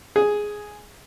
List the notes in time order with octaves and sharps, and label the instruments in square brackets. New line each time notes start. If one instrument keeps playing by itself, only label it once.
[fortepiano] G#4